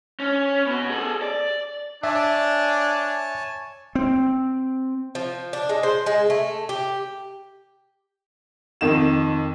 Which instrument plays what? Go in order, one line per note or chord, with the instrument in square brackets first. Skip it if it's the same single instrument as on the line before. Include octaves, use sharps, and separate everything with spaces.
[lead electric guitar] C#4
B3 F#4
G#4 A4
D5
[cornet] D4 [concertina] C#5 G#5 A5 [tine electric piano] E5
[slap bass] C4
[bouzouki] F3
D4
G#3
C5
G#3
A3
G4
[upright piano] F2 D#3 E7